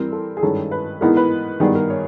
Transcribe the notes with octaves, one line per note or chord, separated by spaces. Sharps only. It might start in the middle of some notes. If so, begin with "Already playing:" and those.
Already playing: E3 G3 C4 A#4
A4
G#4
G2 D#3 G#3 C#4 A4
B4
A2 E3 G#3 B3 D#4 A#4
B4
G2 D#3 G3 B3 G#4
A#4
C#5